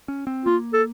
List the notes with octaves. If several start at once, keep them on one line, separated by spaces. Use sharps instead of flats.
C#4
C4
A#3 F4
A4